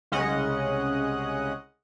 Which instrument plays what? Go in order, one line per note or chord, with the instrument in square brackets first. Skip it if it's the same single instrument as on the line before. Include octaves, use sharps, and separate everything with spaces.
[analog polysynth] C2 C#3 G#3 C#4 D#5 F#5